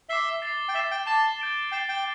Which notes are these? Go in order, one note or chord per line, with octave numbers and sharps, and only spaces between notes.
E5 D6 C7 G7
A6 C7 G7
G5
E5 D6 C7 E7
G5
A5 D6 A6 E7 G7
G6 D7 G7
G5 A6 C7 E7
G5